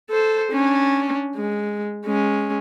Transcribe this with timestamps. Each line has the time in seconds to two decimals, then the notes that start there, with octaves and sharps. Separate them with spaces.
0.10 A4 C5
0.52 C#4 D4
1.36 G#3
2.05 G#3 C#4